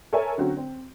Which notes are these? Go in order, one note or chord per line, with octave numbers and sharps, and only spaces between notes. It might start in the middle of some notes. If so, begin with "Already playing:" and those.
A4 A#4 C#5 E5 G#5
D3 F#3 C4 C#4 F#4
C4